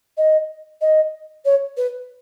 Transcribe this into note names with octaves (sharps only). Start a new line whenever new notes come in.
D#5
D#5
C#5
B4